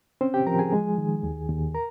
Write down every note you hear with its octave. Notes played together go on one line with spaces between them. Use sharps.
C4 C#4 C5
G4 G5
F3 A#4 A#5
G#4 G#5
G#3
D#3
D#2
D#2
A#4 A#5